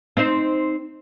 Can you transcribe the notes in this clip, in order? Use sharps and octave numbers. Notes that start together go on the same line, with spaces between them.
C4 D#4 C5